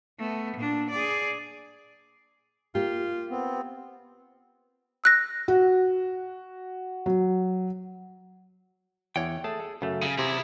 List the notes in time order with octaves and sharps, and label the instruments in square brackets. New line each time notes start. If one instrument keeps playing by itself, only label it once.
[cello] A3 B3
A#2 D4
G#4 D5
[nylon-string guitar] A#3 G4 [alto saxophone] F4
[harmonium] B3 C4
[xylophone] E6 F#6 A#6
[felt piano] F#4
F#3
[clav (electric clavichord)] E2 [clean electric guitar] C#5 F#5 G5
[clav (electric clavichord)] A3 A5 [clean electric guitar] G#4
[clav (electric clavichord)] A4
[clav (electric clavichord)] F#2 A3 [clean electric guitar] C#3
[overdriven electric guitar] C#3 [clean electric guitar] G#5
[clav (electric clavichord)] C3 [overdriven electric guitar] E4 G#4